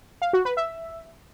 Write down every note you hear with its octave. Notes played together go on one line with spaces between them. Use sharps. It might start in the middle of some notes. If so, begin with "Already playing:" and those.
F5
F#4
B4
E5